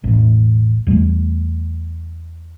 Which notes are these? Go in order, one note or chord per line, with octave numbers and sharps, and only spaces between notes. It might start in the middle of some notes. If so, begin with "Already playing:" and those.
E1 A1
E2 G3 A3